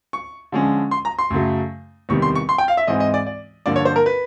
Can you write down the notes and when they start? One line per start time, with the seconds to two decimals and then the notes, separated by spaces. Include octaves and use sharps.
0.13 C#6
0.52 D3 F3 G#3 C#4
0.91 C6
1.05 A#5
1.19 C6
1.30 F#2 C#3 F#3 A3
2.09 E2 C3 D#3 G3 C#6
2.22 C6
2.35 C#6
2.49 C6
2.58 G5
2.68 F5
2.77 E5
2.87 G#2 E3 G#3 C4 D#5
3.00 D#5
3.14 D5
3.27 D5
3.66 G2 D3 F3 A#3 D4 D5
3.76 C#5
3.85 C5
3.96 A#4
4.06 B4